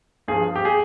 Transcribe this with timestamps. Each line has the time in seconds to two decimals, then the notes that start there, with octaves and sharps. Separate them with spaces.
0.28 G2 F3 G#4
0.56 G4
0.65 G#4